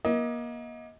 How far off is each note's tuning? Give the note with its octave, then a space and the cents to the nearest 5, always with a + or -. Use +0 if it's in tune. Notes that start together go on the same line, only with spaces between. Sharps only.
A#3 +35 D#5 +25